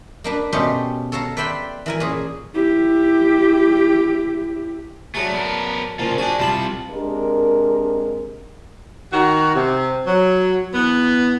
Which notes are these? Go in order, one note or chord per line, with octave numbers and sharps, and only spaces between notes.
A#3 D4 B4
B2 A3 C#4 G4 C6
A4 C#5 F5 A5 A#5
B4 D5 E5 G5 B5 C6
E3 A#4 G#5
A#2 C#4 G#4
E4 G4
D3 F#3 A3 G#4
B3 A#4
A#2 C#3 F3 F4
D4 F#4 G#4 G#5
C3 G3 F4 A5 B5
C3 G#3 D4 A#4
D#3 F#4
C3
F#3
E2 B3